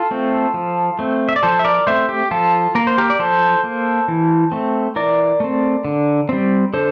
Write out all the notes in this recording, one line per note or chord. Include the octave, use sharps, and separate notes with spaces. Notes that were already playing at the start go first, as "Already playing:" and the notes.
Already playing: F4 A4
A3 C4
F3
A3 C4
E5
D5
F3 A4 C5
E5
A#4 D5
A3 C4 C5 E5
G4
F3 F4 A4
A#3 A#4
C5
G4 A#4
D5
F3 A4 C5
A#3
E3
A3 C4
E3 A#4 D5
A3 C4
D3
G3 C4
D3 A4 C5